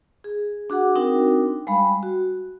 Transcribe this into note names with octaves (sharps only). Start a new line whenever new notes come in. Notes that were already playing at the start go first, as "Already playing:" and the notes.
G#4
D4 F#4 G#4 F#5
C4 D4 D#4 F#4 A#4 G5
G3 G#3 F5 B5
F#4